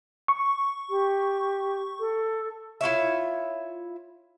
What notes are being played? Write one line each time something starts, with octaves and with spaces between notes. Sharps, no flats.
C#6
G4
A4
E4 F4 C#5 E5